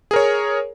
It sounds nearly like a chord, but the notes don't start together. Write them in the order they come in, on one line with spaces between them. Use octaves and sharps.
G#4 A#4 C#5